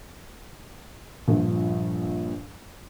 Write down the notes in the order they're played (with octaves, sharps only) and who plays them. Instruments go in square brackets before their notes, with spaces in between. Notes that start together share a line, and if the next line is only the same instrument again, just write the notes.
[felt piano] A#1 G2 F3